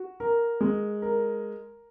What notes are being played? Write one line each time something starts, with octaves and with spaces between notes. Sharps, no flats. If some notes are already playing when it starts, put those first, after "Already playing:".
Already playing: F#4
A#4
G#3
A#4